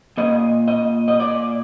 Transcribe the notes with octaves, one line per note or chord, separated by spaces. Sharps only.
A#2 D#5
D#5
D#5
D5